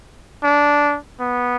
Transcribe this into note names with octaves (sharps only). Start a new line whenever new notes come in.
D4
B3